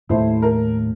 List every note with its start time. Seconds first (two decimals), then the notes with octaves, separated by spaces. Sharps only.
0.09 D#2 A2 A3 E4 C5
0.42 A#4